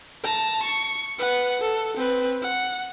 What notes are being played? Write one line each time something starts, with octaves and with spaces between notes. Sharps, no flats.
A5 A#5
C#6
B4 F#5
A4
C4 B4
F#5